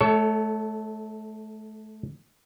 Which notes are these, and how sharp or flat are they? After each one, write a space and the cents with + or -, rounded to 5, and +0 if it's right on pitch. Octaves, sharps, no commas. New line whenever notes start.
A3 -30 A4 +0 C#5 +15